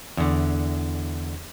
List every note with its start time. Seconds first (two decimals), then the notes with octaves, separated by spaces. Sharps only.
0.17 E2 D3